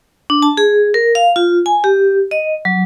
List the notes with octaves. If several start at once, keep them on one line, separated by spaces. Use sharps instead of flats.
D4
A5
G#4
A#4
F5
F4
G#5
G4
D#5
F#3